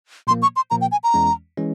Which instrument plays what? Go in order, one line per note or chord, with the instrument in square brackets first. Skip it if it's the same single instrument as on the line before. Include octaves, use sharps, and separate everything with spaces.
[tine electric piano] A#2 F3 A#3 [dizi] C6
[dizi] C#6
C6
[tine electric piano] A#2 F3 A#3 [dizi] A#5
[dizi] G5
G#5
A#5
[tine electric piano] E2 E3 G#3 C#4
E3 G#3 C#4